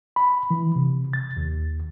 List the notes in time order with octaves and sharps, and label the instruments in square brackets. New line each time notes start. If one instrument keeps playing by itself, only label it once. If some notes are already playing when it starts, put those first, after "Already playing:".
[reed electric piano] B5
E3
C3
A6
D#2